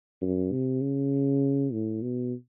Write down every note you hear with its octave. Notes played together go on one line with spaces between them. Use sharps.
F#2
C3
C#3
A2
B2